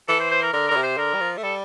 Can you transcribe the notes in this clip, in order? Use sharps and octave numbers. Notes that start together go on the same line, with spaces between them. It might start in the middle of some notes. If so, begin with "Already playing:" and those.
E3 A4
C5
C5
A#4
D3 A#4
D3 A#4
C3
C5
D3 A#4
G3
F3
A3
G3 A4